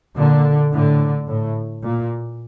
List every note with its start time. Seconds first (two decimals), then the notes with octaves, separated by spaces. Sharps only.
0.16 A#2 D3
0.72 A2 D3
1.28 A2
1.84 A#2